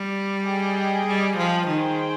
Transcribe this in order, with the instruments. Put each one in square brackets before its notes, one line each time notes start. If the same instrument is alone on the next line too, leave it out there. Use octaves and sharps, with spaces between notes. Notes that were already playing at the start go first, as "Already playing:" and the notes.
Already playing: [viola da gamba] G3
[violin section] G#4 D#5 G5
[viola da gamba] G3
F3
[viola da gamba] D#3 [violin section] G#4 C5 G5